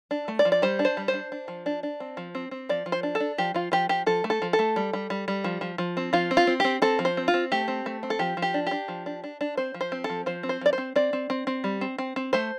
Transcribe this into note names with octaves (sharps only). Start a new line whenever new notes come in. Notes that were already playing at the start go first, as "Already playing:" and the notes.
D4
A3
D5
F3
D5
G3 C5
D4
C5
G3
C5
D4
D4
F3
D4
D4
C4
F3
C4
C4
F3 D5
F3
C5
D4
A4
D4
F3 G4
F3 F4
F3 G4
F3 G4
F3 A4
A3
A4
F3
A4
A3
G3
G3
G3
G3
F3
F3
F3
C4
F3 F4
C4
F4
C4
C4 G4
C4 A4
F3
C5
C4
F4
C4
A3 G4
C4
A3
C4
A4
F3 G4
F3
G4
D4
D4 G4
F3
D4
D4
D4
C4 C5
F3
C5
C4
A4
F3
F3 C5
C4
C5
F3 D5
C5
C4
C4 D5
C4
C4
C4
G3
C4
C4
C4
A3 C5